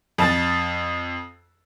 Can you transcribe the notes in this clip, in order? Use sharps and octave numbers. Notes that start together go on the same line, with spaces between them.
F2 A5 A6